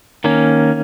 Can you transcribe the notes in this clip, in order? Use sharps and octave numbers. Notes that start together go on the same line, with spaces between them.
D#3 A#3 C#4